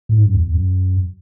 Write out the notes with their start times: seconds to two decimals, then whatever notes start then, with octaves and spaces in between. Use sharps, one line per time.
0.09 A2
0.18 G#2
0.26 F#2
0.34 E2
0.55 F#2